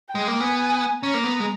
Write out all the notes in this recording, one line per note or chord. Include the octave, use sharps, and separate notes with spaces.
G5
G#3
A#3
B3 G#5
C#4 A#5
A#3
B3
G#3